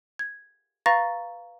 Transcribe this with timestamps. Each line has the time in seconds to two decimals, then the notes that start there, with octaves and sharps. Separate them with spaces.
0.19 G#6
0.86 B4 F5 A#5 C#6 A6 A#6